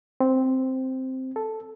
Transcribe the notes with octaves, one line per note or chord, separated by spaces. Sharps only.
C4
A4